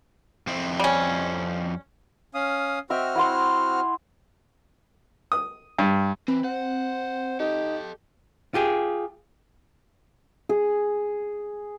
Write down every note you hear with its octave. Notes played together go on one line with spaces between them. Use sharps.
F2 C4 E4
G3 C#4
C#4 F5 D#6
C4 F#4 D#5 E5 G5 F6
E4 F#5 C6
D#6
G2
E3 C4 B4
C5 F#5
D#4 G4 A4 D#5
F4 G4 G#4
G#4